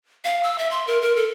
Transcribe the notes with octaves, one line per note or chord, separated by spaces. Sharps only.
F5
E6
E5
C6
A#4
A#4
A4